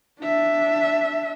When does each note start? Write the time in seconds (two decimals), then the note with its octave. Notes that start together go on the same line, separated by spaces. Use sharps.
0.21 D4 E5